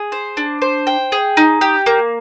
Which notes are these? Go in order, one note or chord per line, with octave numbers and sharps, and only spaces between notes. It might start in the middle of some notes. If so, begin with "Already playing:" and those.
Already playing: G#4
C5
D4
C5
G5
G#4
D#4
G4
A#3